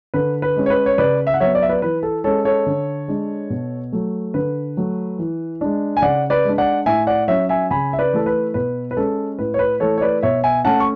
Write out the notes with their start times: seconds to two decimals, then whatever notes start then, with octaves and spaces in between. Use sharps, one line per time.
0.14 D3 B4
0.42 B4
0.56 G#3 C#4
0.66 C#5
0.70 B4
0.86 C#5
0.98 C#3 B4 D5
1.27 E5
1.34 F#5
1.40 F#3 B3 C#5 E5
1.55 D5
1.62 E5
1.69 B4 D5
1.82 E3 B4
2.03 A4
2.24 G#3 C#4 A4 C#5
2.45 A4 C#5
2.66 D3
3.08 G#3 D4
3.50 B2
3.92 F#3 A3
4.34 D3 B4
4.77 F#3 A3
5.19 E3
5.61 G#3 D4
5.97 G#5
6.02 C#3 D5 F#5
6.30 B4 D5
6.45 G#3 D4
6.58 D5 F#5
6.86 A2 E5 G#5
7.07 D5 F#5
7.28 F#3 C#4 C#5 E5
7.49 E5 G#5
7.71 C#3 G#5 B5
7.93 E5
7.99 B4 D5
8.13 E3 A3 A4
8.26 B4
8.54 B2 B4
8.91 B4
8.96 G#3 C#4 A4
9.39 A2 B4
9.54 C#5
9.59 B4
9.80 E3 A3 A4 C#5
9.98 C#5
10.01 B4 D5
10.23 B2 C#5 E5
10.44 E5 G#5
10.65 A3 C#4 F#5 A5
10.80 C#6